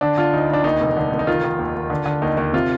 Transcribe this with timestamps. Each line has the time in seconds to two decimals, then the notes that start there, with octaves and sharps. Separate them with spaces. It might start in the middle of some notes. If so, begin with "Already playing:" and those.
0.01 D3 D4
0.17 D3 F4
0.33 D2 D#4
0.49 D2 D4
0.64 D#2 D#4
0.81 F1
0.97 D3
1.12 F1
1.19 D#4
1.27 D#3 F4
1.44 D#3
1.59 D#2
1.75 D#2
1.90 D3
2.06 D3
2.22 D#2 D#4
2.37 D#2 D#4
2.53 C3 F4